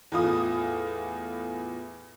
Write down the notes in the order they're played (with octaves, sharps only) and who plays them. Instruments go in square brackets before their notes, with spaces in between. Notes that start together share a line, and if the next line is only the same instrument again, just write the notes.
[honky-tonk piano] E2 A2 F4 F5 D#6